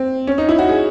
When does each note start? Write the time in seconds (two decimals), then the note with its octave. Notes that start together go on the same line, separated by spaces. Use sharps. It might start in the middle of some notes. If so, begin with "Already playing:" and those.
Already playing: C4
0.27 C#4
0.38 D#4
0.49 E4
0.59 F#4
0.69 G#4